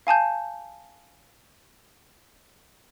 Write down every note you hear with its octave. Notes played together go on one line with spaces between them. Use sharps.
F5 G#5 A5 G6